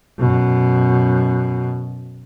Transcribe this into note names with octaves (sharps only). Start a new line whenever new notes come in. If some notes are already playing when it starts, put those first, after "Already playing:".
F#2 B2